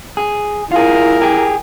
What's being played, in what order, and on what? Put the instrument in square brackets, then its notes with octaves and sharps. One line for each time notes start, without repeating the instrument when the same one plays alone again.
[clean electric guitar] G#4
[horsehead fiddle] E4 A#4 [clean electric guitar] F4 G#4
[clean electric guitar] G4 G#4